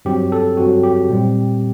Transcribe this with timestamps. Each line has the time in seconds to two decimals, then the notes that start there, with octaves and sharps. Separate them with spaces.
0.05 G2 F#3 C4 G4
0.32 A4
0.57 G2 F#3 C4 F#4
0.83 G4
1.09 A#2 G3 C4